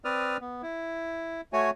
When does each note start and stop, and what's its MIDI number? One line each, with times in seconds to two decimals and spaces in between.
0.05 0.37 60
0.05 0.37 71
0.05 0.37 74
0.05 0.37 87
0.05 0.37 89
0.41 0.62 59
0.62 1.41 64
1.53 1.70 57
1.53 1.70 66
1.53 1.70 73
1.53 1.70 80